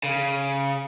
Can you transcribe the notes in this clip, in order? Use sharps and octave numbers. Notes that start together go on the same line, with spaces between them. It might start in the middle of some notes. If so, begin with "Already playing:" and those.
C#3